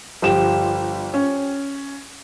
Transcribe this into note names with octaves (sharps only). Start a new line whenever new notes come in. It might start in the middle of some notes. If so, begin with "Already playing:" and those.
G1 F3 G4 E7
C#4